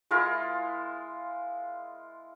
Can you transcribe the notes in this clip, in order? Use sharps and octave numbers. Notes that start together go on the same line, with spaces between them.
G#3 E4 F4 A#4